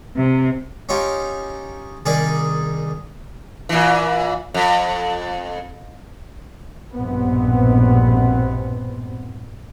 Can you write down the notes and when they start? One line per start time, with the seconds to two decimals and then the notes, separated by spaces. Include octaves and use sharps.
0.17 C3
0.89 C#4 D#4 F4 G4
2.06 C2 D#3 D#4 G#4 D5
3.69 A#2 E3
4.54 F2
6.93 A#1 G2 B2 B3 C4